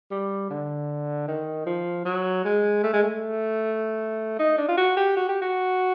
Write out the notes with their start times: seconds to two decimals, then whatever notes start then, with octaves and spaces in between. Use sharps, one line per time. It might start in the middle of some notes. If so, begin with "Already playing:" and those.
0.11 G3
0.50 D3
1.28 D#3
1.66 F3
2.05 F#3
2.44 G#3
2.83 A3
2.93 G#3
3.03 A3
4.39 D#4
4.58 D4
4.69 F4
4.77 F#4
4.97 G4
5.16 F#4
5.28 G4
5.42 F#4